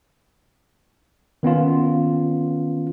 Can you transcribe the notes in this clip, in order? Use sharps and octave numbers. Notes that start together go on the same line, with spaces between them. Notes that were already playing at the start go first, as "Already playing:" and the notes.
D#3 B3 C#4 F4